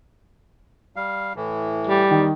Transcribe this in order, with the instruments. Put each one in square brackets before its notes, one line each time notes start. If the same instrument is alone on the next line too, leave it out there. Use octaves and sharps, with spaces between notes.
[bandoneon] G3 F5
A2 E3
[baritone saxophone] G3
[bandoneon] E2 [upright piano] D#3